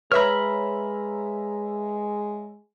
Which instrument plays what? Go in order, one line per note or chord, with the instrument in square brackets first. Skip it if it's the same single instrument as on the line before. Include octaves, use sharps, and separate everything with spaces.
[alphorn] G#3 [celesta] B4 [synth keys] C#5 E5 A#5 [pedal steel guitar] B5 F6